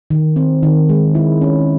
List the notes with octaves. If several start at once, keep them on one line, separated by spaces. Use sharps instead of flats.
D#3
C4
D#3
G#3
E4
C#4